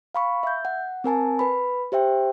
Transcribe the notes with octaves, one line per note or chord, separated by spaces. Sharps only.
F5 B5 C#6
E5 G6
F#5
C4 A#4 G#5 A5
B4 B5
G4 C5 E5 G5